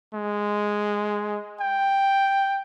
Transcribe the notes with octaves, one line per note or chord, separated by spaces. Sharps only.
G#3
G5